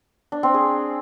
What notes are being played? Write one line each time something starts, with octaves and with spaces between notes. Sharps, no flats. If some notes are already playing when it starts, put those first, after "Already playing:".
D4
C4
G#4